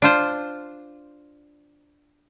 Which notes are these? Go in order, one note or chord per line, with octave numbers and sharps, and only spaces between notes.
D4 F4 C5